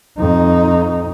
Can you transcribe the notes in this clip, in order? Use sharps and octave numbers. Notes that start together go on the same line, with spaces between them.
F2 D#4